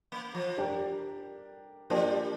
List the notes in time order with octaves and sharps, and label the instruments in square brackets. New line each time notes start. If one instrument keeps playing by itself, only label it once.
[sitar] A#3
F3
[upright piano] G3 D4 G4 A#4
[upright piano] F3 A#3 D4 G4 [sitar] G3